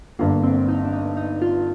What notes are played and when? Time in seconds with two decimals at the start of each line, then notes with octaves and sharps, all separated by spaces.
0.19 G1 G2 D3 A#3
0.43 C4
0.68 D#4
0.85 D4
0.93 D#4
1.17 D#4
1.42 F4